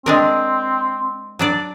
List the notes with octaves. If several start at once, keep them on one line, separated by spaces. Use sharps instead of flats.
G#3 C4 D4 A#4
F#3 D4 D5